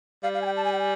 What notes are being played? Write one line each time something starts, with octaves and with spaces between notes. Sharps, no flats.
G3 F5
F5
G#5
G5
A5
G#5
G5
G#5